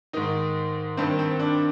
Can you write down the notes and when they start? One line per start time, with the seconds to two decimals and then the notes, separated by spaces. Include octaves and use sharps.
0.13 G#2 D#3 D#4
0.97 G2 D#3 C4
1.19 C4
1.39 D4